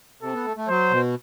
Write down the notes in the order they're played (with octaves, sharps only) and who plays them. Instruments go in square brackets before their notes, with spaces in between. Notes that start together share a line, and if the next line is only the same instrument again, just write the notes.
[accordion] C3 [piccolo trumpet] A4
[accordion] B3
A3
A3
[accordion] F#3 [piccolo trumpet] C5
[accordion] B2